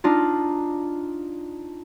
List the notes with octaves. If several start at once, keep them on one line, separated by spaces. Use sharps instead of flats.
D4 D#4 F4